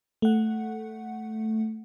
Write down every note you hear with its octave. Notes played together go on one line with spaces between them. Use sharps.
A3 F#5